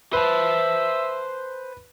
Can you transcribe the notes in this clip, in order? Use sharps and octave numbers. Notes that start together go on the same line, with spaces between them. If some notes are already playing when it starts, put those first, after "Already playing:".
B4 C5 E5 A5